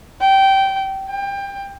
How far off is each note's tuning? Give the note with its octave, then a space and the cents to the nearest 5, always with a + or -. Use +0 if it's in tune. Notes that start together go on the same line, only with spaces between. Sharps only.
G5 -15
G5 +25